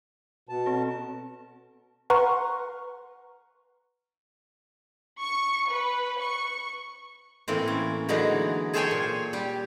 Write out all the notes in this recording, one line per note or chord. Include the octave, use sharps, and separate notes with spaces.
B2 A5
C4 A4
B4 F#5 A#5 C6 C#6 F6
C#6
B4
C#6
A2 E3 A#3 C4
C#4
D3 E3 F#3 G#3 A#3 D#4
G#4 A4 C5 C#5 G5 G#5
A#2
G3 G4